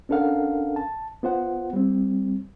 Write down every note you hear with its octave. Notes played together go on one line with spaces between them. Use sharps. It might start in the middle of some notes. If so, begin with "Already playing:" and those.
C#4 D4 A4 A#4 F5 F#5
A5
B3 F4 C5 F#5
G3 C4